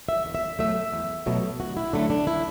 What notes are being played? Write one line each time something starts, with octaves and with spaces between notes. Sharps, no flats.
E5
E2
E5
B2 F#3 A3 E5
E2
B2 F#3 A3
D2 F#4
E4
D3 F#3 A3 D4
D4
E4